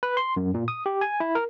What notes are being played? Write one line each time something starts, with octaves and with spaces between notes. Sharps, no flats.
B4
C6
F#2
A#2
D#6
G4
G#5
E4
A#4